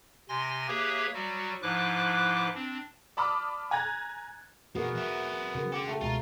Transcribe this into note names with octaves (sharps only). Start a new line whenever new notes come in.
C3 G#5 C6 A#6
A#3 G4 G#4 B4 C#5 E5
F#3 G3 F#4
G#2 F3 E4 B4 D6 F#6
C4 D4
D5 A5 B5 D6 D#6 F6
G#5 A#5 F#6 G#6 A6
B1 A#3 B3 F#4 G#4 A#4
F#3 E5
C#3 F#4 A#4
A4 F#5 G5 D6
A3 G5 A5
C#2 B2 F4 A#5